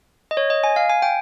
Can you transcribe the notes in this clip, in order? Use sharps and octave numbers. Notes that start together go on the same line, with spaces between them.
D#5
C#5
D#5
G#5
F5
G#5
G5